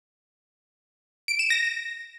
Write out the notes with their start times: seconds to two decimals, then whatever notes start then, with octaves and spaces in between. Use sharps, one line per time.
1.28 D7
1.39 E7
1.50 A#6